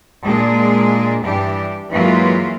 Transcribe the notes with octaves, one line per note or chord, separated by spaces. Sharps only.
A#2 G#3 D4 G#4
G2 E3 D4 G4
E3 F#3 G#3 A#3 F4